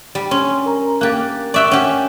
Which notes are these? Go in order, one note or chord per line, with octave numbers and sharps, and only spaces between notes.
G3
C#4 C6
A#4 A#5
A#3 G4 F#6 A6
D5 E5 G5 C#6 D6 F#6
C#4 G4 F#5 G5